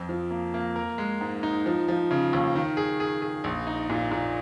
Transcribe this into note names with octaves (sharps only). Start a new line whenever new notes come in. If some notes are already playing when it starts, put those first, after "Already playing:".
Already playing: F2
F3
A#3
A#3
A#4
G#3
G#2
D#4
F3
F3
C#3
D#2
D#3
G#4
G#4
G#4
A#1
D#4
A#2
A#2